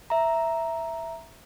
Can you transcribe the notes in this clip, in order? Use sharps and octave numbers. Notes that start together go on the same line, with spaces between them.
E5 A#5